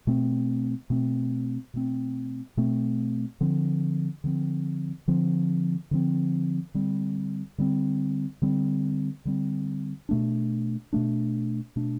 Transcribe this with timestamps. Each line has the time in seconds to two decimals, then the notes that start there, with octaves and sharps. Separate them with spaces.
0.07 B2 A3 C4
0.90 B2 A3 C4
1.74 B2 A3 C4
2.57 B2 A3 C4
3.41 D3 F3 C4
4.24 D3 F3 C4
5.08 D3 F3 C4
5.91 D3 F3 C4
6.74 D3 G3 C4
7.58 D3 G3 C4
8.42 D3 G3 C4
9.25 D3 G3 C4
10.09 B2 A3 D4
10.93 B2 A3 D4
11.76 B2 A3 D4